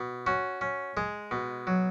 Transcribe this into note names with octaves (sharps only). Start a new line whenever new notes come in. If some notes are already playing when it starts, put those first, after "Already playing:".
Already playing: B2
C#4 F#4
C#4
G#3 G#4
B2
F#3